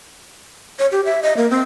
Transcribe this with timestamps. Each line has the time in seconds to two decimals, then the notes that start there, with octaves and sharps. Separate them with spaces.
0.79 C#5
0.92 G4
1.05 E5
1.23 D#5
1.37 A#3
1.50 C4